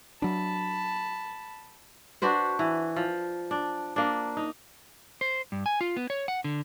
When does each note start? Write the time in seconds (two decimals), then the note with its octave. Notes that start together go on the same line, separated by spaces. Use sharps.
0.22 F#3 D4 A5 B5
2.22 D4 F#4 B4 C5
2.59 E3
2.96 F3
3.51 D4
3.96 A#3 D4
4.37 D#4
5.21 C5
5.52 G2
5.66 G#5
5.81 F4
5.97 B3
6.10 C#5
6.28 F#5
6.44 D3